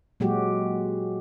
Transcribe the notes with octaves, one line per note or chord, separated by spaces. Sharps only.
A#2 F#3 G#3 F#4 G4